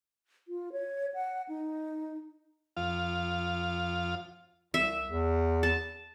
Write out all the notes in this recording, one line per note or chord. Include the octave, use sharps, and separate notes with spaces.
F4
C#5
F#5
D#4
F2 F4 F5
C2 E5
E2
A5